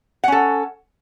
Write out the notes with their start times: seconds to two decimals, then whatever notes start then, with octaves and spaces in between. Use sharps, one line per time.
0.24 F#5
0.28 C#4
0.32 A4